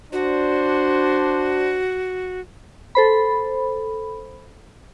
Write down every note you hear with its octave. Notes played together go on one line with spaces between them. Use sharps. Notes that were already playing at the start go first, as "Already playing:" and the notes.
D4 F#4 C5
A4 C5 B5